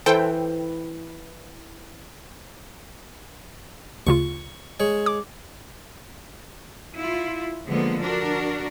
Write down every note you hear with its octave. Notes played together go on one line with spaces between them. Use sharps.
E3 A4 C5 G5
D2 C#3 F4 C#6
G#3 C#5
D6
E4 F4
D3 F3 G#3 A#3 B3
D4 F#4 A#4